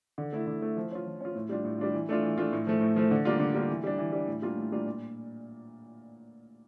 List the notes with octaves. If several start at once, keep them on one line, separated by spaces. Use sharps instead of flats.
D3
A3 E4
D3
A3 E4
F3
C#4 F4
F3
C#4 F4
A2
G3 D4 F4
A2
G3 D4 F4
E3
A3 D4 F4
E3
A3 D4 F4
A2
F3 A3
A2
F3 A3
D3
G3 A#3 D4 F4
D3
G3 A#3 D4 F4
E3
G3 D4
E3
G3 D4
A2
G3 A#3 D4 F4
A2
G3 A#3 D4 F4
A#2